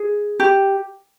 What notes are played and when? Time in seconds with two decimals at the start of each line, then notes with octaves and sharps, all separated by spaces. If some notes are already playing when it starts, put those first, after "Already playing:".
Already playing: G#4
0.40 G4